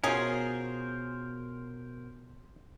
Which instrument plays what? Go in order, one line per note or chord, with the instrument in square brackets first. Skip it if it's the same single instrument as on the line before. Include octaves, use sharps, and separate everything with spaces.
[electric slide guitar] B2 F#4 [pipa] F#3 G#4 [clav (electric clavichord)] C#4 F4 [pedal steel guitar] A#4 C5